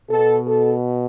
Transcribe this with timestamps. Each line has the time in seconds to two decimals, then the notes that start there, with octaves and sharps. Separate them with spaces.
0.10 B2 A4
0.47 A4